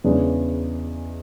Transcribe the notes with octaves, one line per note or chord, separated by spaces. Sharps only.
E2 C#3 G#3 D4